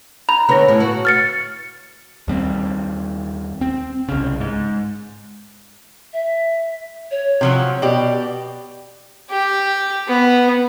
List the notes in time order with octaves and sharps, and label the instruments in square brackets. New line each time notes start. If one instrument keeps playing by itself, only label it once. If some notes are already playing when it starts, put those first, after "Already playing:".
[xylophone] A#5 B5 F7
[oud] D3 B3 C#4 [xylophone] B5 A#6
[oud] A2 B3
F#4
[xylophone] F6 A6 C#7
[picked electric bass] D#2 G3 C4
C4
C2 C#3
G#2
[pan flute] E5
C#5
[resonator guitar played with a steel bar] C3 F3 F#3
[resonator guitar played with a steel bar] B2 G4 [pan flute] D5
[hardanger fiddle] G4
B3